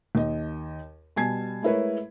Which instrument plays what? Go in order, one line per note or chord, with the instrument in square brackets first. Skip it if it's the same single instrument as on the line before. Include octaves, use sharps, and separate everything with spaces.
[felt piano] D#2 D#5
B2 G3 G#5 A5 G#6 C7
G#3 A3 E4 A#4 B4 C#5